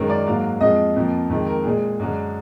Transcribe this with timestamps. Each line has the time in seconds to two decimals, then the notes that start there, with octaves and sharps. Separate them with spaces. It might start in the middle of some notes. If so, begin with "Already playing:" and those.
Already playing: F#2 D#3 G#3 A#4
0.10 D5
0.26 G#2 F#3 A#3 F5
0.61 F2 F3 G#3 D#5
0.96 F2 F3 A#3
1.30 F2 D#3 G#3
1.47 A#4
1.64 A#2 G#3 G#4
2.00 F#2 D3 G#3